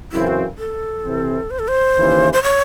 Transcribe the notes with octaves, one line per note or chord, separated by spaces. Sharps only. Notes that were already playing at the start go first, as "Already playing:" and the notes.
F#2 C#3 E3 C4 E4
F#4
A4
C3 E3 C4
C5
A4
C5
D#2 C#3 E3
C5
C#5